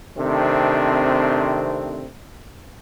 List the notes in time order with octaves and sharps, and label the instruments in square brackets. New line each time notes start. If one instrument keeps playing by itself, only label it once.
[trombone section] C3 D#3 A3 C4 D4